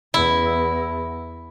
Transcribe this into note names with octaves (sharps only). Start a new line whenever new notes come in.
E2 E4